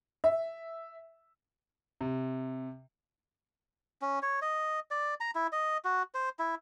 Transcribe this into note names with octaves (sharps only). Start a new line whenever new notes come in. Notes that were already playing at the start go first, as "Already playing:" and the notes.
E5
C3
C#4
C#5
D#5
D5
A#5
E4
D#5
F#4
C5
E4